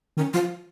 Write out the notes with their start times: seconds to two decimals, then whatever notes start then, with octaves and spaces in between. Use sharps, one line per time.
0.17 D#3 C#4
0.34 F3 F4